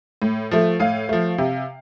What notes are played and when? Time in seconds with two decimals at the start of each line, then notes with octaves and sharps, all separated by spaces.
0.22 A2
0.51 F3 A3
0.80 A2 F5
1.09 F3 A3
1.38 C3